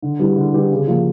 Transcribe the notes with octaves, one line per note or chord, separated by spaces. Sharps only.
D3
G3 B3 E4 G4
D3
G3 B3 E4 G4
C#3
F3 A#3